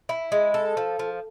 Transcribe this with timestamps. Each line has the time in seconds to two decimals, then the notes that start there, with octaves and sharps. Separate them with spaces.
0.09 E4
0.32 G#3
0.54 A4
0.77 F3
0.99 F3